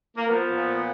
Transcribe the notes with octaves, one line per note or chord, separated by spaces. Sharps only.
A#3
F3 B3
A#2